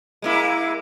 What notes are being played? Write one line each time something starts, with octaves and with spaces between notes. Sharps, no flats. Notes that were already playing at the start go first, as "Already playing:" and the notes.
G#3 A#3 E4